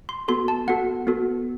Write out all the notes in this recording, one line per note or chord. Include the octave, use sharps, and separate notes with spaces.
C6
B3 F#4 A4 C6
A5
B3 F#4 A4 F#5
B3 F#4 A4